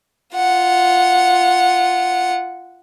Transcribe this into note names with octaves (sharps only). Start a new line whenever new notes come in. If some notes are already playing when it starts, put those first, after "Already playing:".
F4 F#5